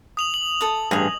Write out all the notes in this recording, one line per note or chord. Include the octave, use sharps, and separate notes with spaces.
D#6 F7 F#7
F#7
A4 D#6
A1 G2 G#4 D#5 G#5